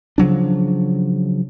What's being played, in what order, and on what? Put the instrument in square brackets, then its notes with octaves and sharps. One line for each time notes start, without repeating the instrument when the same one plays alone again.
[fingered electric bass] C#3 F3 F#3 D4